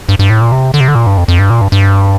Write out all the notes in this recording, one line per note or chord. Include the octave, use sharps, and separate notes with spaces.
G2
G2
A2
A#2
C3
D3
C3
D3
A#2
G2
F2
F2
G2
A#2
G2
G2